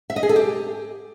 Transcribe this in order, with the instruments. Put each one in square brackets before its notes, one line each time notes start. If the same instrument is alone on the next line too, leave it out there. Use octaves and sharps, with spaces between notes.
[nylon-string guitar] E5
D#5
G#4
A4
G4